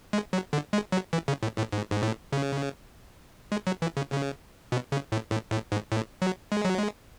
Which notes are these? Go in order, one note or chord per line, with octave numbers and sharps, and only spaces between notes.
G#3
F#3
D3
G#3
F#3
E3
C#3
A2
A2
G#2
G#2
A2
C#3
G#3
F#3
E3
C#3
C#3
B2
C#3
A2
A2
A2
G#2
A2
F#3
G#3
F#3
G#3